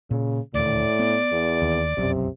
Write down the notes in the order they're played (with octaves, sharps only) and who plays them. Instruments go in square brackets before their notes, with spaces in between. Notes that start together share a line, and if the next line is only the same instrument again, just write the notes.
[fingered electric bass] A#2 [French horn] C#3
[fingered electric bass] D#1 D2 [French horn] A2 [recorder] D5
[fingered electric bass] B3
[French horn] E2
[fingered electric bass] D#2
[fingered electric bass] F1 B1 F#2 [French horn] C3